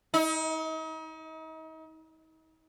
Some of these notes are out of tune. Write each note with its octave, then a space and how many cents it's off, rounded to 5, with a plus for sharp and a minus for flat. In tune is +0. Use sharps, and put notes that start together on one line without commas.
D#4 +40